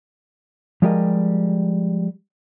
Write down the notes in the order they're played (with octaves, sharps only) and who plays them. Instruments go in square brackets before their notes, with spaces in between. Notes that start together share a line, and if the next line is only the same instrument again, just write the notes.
[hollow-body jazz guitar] F3 G3 G#3 G4 A#4 D#5